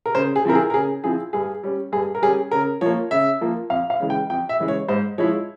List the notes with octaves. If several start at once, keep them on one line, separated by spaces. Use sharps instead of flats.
A#4
C#3 C5
G#4
F3 C4 E4 A#4
G#4
A#4
C#3 G#4
F3 C4 E4 G#4
G2 G#4
G3 C#4
G2 G#4
A#4
G3 C#4 G#4
C#3 A#4
F3 A#3 C#5
C#3 E5
F3 A#3
F2 F5
F5
C#3 E3 G#3
G5
F2 G5
E5
C#3 E3 G#3
C#5
G#2 C5
F3 G#3 E4 C#5